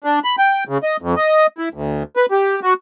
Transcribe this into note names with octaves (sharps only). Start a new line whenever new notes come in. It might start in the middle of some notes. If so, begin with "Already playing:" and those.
D4
B5
G5
C#3
D#5
F2
D#5
E4
D2
B4
G4
F#4